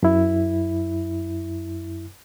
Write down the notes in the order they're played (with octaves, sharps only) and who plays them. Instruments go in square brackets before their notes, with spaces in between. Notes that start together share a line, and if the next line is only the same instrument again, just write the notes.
[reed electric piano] F#2 E4